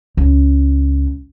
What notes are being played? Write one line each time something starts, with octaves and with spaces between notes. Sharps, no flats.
C#2